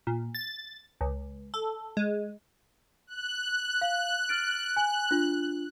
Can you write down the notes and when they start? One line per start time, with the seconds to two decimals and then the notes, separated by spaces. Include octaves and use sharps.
0.07 A#2
0.35 A6
1.01 C#2
1.54 A4
1.97 G#3
3.07 F#6
3.81 F5
4.29 F6 A6 D7
4.77 G#5
5.11 D4 F4